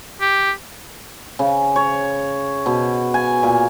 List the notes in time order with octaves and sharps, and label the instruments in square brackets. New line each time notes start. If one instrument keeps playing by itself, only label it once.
[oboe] G4
[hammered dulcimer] C#3
C#5
B2
G#5
A#2